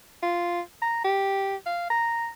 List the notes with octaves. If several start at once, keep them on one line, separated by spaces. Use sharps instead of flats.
F4
A#5
G4
F5
A#5